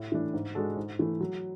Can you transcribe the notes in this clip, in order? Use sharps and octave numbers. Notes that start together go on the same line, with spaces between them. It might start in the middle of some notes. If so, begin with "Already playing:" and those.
Already playing: A2
E3 A3 D4
G#2
G#3 D4 F#4 A4
G#2
E3 A3
F#3